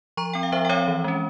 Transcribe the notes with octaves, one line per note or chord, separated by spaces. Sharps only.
F3 A#5 C#6
C4 G5
F5
F3 C5 E5
G5
C4 C#5 F5
E3
G#3 C#4